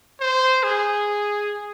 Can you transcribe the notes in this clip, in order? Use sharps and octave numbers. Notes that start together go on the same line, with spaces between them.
C5
G#4